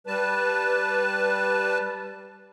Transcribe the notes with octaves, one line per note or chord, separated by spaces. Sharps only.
G3 B4 A5